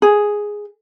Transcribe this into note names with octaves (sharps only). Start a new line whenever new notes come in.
G#4